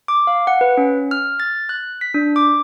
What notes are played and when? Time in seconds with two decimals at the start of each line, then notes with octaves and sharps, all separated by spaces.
0.08 D6
0.27 F5
0.47 F#5
0.61 B4
0.77 C#4
1.11 F6
1.40 A6
1.69 F#6
2.01 B6
2.14 D4
2.36 D6